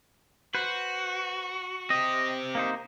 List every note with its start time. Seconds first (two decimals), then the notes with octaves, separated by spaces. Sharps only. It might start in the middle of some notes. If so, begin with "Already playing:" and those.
0.55 F#4 B4 C5
1.90 C4 G4 D#5
2.55 A#3 D#4 C5